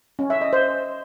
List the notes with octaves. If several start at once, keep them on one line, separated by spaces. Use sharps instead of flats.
C#4
E5
D#5
C5